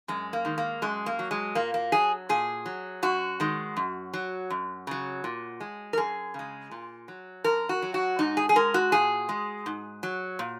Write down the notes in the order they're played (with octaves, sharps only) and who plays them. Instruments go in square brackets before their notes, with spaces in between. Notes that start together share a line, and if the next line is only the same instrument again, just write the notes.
[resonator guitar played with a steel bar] F#2 G#3
A#3
D#3 G#3
A#3
F#2 G#3
A#3
F#3
G#3
A#2 A#3
A#3
F#3 G#4
A#2 G#4
F#3
F#2 F#4
D#3 G#3
F#2
F#3
F#2
C#3 F#3
A#2
G#3
A#4
F#2 G#4
C#3 G#3
A#2
F#3
F#2 A#4
F#4
F#3
F#4
G#2 D#4
G#4
G#4
G#3 A#4
F#4
A#2 G#4
G#3
G#2
F#3
A#2